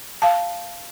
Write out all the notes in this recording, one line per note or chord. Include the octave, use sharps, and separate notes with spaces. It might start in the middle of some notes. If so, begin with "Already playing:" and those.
F5 A5